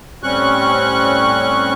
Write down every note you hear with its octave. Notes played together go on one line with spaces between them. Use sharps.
A2 G3 C4 C#4 C#6 F#6